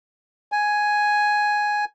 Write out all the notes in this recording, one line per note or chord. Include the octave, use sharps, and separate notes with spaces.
G#5